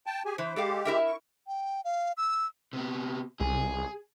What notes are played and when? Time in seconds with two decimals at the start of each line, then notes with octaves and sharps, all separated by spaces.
0.06 G5 A5
0.25 G4 G#4 G#5
0.38 E3 C5
0.56 G#3 G4 A4 D5 F5
0.85 E4 A#4 E5
1.07 C#6
1.47 G5
1.85 F5
2.17 E6
2.73 C3 B3
3.40 C2 G#4